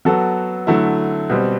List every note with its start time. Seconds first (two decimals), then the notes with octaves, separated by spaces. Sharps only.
0.05 F#3 B3 F#4 A4
0.67 D3 F#3 A3 E4
1.29 B2 G3 C4